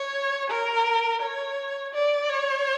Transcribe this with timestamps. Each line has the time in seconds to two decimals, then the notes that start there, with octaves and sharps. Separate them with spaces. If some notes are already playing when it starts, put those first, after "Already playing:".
Already playing: C#5
0.50 A#4
1.21 C#5
1.93 D5
2.29 C#5